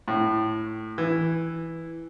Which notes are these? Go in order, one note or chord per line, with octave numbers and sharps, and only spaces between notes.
A2
E3